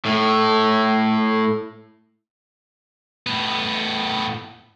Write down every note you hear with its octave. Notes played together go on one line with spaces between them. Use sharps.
A2 A3
A2 B3